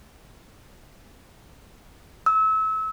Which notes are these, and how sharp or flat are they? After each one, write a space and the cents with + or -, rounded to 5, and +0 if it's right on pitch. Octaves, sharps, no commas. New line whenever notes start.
E6 -30